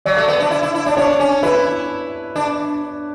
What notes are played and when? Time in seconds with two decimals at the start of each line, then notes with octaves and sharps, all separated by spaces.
0.06 F#3 D5
0.17 A3
0.28 B3
0.40 D4
0.51 E4
0.63 E4
0.75 E4
0.86 D4 D5
0.97 D4 C#5
1.20 C#4
1.43 E4 B4
2.36 D4